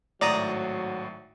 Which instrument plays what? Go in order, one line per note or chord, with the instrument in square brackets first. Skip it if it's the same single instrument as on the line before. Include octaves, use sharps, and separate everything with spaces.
[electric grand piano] G#1 A2 F#4 [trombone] F#3 [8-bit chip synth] D5 A#5 D#6